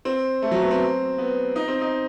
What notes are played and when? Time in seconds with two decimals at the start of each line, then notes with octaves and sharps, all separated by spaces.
0.05 C4
0.42 A3
0.51 F#3
0.62 B3
0.71 C4
1.18 B3
1.56 D#4
1.68 C4
1.81 D#4